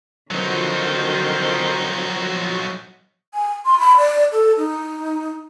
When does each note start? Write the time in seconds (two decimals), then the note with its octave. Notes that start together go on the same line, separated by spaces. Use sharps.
0.31 D3 D#3 F3 F#3 C4 D#4 F#4
3.34 G#5
3.65 C6
3.79 B5
3.97 D5
4.32 A4
4.57 D#4